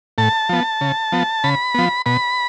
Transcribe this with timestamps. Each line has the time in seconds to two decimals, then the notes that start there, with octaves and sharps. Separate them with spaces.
0.18 A2 A5
0.49 F3 B3
0.81 C#3
1.12 F3 B3
1.44 C#3 B5
1.74 F3 B3
2.06 B2 B5